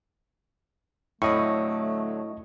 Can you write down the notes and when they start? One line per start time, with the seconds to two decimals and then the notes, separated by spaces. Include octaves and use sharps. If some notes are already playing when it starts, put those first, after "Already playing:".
1.22 A2 D3 F#3 A3 C4 D#5 C#6